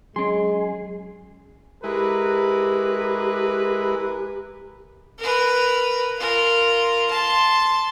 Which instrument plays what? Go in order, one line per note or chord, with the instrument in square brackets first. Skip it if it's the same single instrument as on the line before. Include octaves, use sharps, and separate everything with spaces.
[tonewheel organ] F#3 [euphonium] G#3 [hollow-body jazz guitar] C#4 C6 [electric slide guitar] G#4
[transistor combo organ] G#3 E4 [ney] G4 [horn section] A#4 B4
[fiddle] A#4 B4
F4 A#4
A5 C6